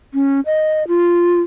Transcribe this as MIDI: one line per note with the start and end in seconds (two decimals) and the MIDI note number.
0.14 0.40 61
0.46 0.87 75
0.88 1.41 65